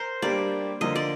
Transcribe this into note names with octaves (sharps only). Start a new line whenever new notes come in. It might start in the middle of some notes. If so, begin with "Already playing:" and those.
Already playing: A#4 C5
G3 A#3 D4 G4 D5
D3 F3 A#3 F4 D#5
D5